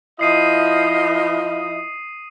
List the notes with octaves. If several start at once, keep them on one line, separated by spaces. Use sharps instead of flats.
F3 E4 D#5 D#6 C7 D#7